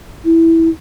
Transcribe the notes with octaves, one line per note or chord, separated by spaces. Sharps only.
E4